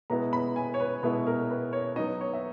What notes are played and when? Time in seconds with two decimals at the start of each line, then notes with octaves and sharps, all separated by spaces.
0.10 B2 G#3 B3 E4 A#5
0.33 B5
0.56 G#5
0.74 C#5
0.80 B4
1.02 B2 G#3 B3 E4 B4
1.27 A#4
1.50 B4
1.73 C#5
1.96 F#3 B3 D#4 D#5
2.21 C#5
2.33 E5